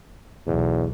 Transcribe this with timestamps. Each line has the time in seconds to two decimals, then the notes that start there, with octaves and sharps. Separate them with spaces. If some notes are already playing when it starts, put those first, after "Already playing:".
0.47 B1 E2